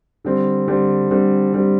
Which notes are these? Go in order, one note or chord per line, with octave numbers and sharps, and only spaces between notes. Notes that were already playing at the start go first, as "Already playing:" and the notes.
D3 G3 C4
D3 G3 C4
D3 G3 C4
D3 G3 C4